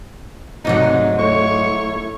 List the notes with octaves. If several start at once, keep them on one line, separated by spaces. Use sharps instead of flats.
D2 G#2 C3 F#3 D#4
A3 E4 C#5 C#6